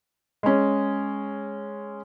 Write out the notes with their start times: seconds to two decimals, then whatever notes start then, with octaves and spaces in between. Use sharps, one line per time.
0.43 G#3 C#4